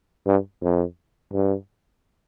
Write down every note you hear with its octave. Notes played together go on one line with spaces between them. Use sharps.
G2
F2
G2